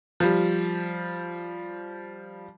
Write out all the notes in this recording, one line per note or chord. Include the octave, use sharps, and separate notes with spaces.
F3 G3